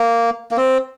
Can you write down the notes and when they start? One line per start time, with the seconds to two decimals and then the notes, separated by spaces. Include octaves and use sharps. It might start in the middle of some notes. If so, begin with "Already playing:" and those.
Already playing: A#3
0.51 A#3
0.57 C4